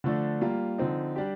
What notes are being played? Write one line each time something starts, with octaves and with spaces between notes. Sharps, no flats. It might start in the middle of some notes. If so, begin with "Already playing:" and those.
D3 F3 A3 D4
G3 A#3 F4
D3 F3 C4 D#4
G3 D4 G4